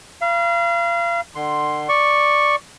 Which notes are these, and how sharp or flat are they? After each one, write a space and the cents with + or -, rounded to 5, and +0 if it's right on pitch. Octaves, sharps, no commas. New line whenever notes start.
F5 -30 B5 -40
D3 +35 C6 +0
D5 +0 C#6 -5